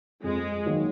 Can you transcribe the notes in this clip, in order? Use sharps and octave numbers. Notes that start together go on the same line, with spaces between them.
F2 G#3
D#3 F#3 A#3